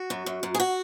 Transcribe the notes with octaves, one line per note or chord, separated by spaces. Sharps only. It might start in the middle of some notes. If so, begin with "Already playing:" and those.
Already playing: F#4
F#2
F#2
F#2
G#4
F#4